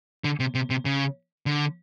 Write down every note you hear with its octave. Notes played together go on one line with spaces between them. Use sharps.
D3
C3
C3
C3
C#3
D3